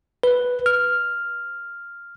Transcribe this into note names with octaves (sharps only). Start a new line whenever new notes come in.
B4
F6